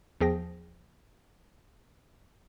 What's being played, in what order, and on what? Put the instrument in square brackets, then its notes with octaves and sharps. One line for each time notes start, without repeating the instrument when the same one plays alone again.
[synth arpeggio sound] E2 F3 G#4 G5 A#6